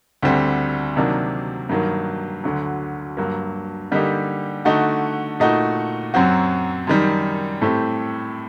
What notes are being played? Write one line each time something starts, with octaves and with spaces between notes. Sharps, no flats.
D2 D3 G3 C4
C3 D#3 F#3 A#3 D4
G2 D#3 F#3 A#3
D2 D3 F#3
G2 F#3 A#3
D3 G3 A#3 D#4 G4
D3 A3 D#4 F#4
A#2 A3 D#4 F#4
F#2 F#3 C4 F#4
F#2 D#3 G3
A2 A3 C4 G4